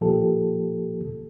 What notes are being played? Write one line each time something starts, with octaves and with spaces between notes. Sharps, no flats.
A#2 F3 A#3 G4 A4